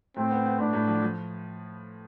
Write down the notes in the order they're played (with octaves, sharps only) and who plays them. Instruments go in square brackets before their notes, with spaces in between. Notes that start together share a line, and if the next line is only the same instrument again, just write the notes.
[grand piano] A2 [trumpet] C4
[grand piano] B3
B3
[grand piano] A2 [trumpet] D4
[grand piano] A2
F3
F3